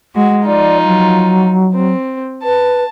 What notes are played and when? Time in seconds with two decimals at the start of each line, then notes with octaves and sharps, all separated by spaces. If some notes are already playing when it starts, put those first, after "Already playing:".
0.16 G#3 F#4
0.46 F3 D#4 F4 D5
0.85 F#3
1.75 C4
2.44 B4 A5